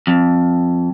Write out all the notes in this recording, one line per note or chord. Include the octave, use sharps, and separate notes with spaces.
F2